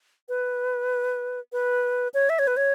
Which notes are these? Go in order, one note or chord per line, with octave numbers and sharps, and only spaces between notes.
B4
B4
C#5
E5
C#5
B4
C#5